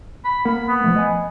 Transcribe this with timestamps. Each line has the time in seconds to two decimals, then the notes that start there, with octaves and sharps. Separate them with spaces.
0.25 B5
0.45 A#3 A#4 F#5 B5
0.68 B3
0.84 F3 G#3 A3
0.96 D#5 G#5